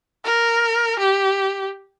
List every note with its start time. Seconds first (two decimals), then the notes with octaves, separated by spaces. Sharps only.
0.25 A#4
0.99 G4